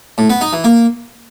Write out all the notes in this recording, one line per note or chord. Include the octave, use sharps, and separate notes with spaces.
A2
B3
D#4
E3
A#3